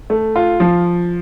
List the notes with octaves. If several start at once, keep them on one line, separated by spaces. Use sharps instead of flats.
A3
F4
F3